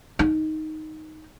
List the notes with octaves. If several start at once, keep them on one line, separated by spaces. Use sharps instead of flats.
D#4